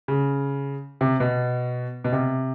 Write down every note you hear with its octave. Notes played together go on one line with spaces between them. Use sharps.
C#3
C3
B2
B2
C3